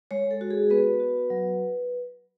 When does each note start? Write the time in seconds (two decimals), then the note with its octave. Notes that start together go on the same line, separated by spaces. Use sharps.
0.11 G#3 C#5
0.31 A4
0.41 F#4
0.51 G#4
0.70 B3 B4
1.00 F#4
1.30 F#3